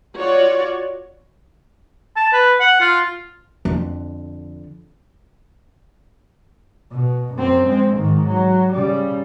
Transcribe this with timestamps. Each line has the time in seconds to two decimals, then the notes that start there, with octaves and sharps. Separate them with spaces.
0.15 F4 F#4 C#5 D5
2.16 A5
2.33 B4
2.60 F#5
2.81 F4
3.65 F2 D3
6.91 B2
7.35 F#2 C4
7.67 G#3 C4
7.97 G#2 D#3
8.27 F#3
8.73 C#3 G3